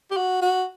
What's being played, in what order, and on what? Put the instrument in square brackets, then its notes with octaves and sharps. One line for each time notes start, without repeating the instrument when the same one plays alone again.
[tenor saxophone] G4
F#4
F#4